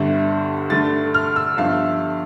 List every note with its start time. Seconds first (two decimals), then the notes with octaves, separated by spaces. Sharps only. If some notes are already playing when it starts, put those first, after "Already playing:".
Already playing: G1 G2 D3 G3
0.70 G2 D3 A3 A6
1.14 F6
1.36 E6
1.57 G1 G2 F3 F5